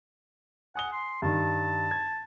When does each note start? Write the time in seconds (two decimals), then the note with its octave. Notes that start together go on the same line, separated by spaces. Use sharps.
0.75 F#5 G#5 D#6 G7
0.92 C6
1.22 G2 D#3 A5
1.91 G#6